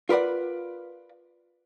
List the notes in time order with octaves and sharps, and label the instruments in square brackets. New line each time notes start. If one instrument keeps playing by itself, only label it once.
[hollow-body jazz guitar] F4 A#4 B4 D5 F#5